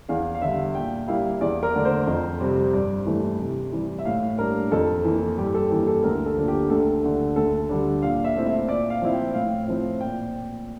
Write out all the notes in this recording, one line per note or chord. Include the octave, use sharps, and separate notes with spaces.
E2 F5
F5
D3 G3 E5
A#2 G5
G3 A#3 E4 F5
E2 D5
A#4
D3 A3 D5
C5
F2
C3 G3 C4
G2 D5
E3 A3
C3
E3 G3
E5
A2 F5
G3 A#3 D4 A#4
F2 A4
E3 A#3
G2 G4
A4
E3 A#3 G4
A4
D2 A#4
A4
D3 F3 A#3 D4
G4
D2 A4
D3 A3
D2 A4
D3 G3 D4
A#2 F5
E5
A3 C4 E4
E5
A#2 D5
F5
F3 C4 E4
G5
A2 F5
F3 C4 E4
A#2 G5